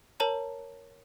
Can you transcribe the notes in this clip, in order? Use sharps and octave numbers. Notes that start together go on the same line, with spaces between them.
A#4 C#5 A5 A#5